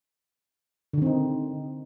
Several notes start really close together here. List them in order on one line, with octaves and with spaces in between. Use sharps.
D3 D#3 C4 D#4